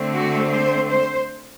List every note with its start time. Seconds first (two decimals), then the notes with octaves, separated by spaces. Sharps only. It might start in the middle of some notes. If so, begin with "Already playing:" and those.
Already playing: D3 A3 C4
0.14 F#4
0.51 C5
0.90 C5